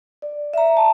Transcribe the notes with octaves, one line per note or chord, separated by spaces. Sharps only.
D5
E5 A#5
A5